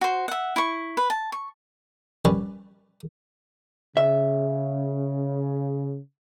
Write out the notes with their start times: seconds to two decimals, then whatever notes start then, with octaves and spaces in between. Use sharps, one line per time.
0.01 F#4 C5
0.28 E5 F#5
0.56 E4 C#6
0.97 B4
1.10 A5
1.32 C#6
2.25 G3 C#4 B4 C#5 D5
3.97 C#3 E5